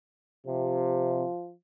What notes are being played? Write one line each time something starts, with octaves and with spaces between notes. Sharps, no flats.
C3 F3